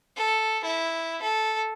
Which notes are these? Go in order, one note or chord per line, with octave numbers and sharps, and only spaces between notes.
A4
E4
A4